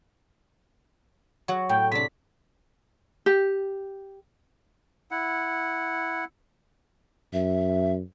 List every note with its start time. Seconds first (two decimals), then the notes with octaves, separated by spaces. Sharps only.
1.48 F#3 F#4 F#5
1.69 A2 G5
1.92 C3 D4 B6
3.26 G4
5.11 E4 F#5
7.33 F#2 E5